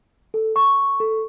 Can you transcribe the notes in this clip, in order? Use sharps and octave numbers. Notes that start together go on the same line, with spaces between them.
A4
C#6
A4